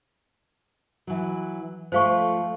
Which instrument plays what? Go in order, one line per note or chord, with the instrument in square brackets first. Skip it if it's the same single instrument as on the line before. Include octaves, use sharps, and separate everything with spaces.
[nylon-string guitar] E3 F#3
[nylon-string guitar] F3 A3 [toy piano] C5 F5 C#6